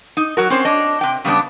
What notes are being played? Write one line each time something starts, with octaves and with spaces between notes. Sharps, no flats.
D#4
F#3 F#4 A#4
C4 C#4 C5 C#5
D4 C#5 D#5
C3 G5
C#3 G3 B3 D4